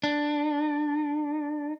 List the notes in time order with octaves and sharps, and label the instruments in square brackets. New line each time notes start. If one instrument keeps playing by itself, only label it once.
[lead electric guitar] D4